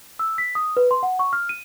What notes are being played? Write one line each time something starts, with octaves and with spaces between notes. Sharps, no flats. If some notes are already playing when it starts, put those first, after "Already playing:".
E6
B6
D#6
B4
C6
F#5
C#6
F6
D#7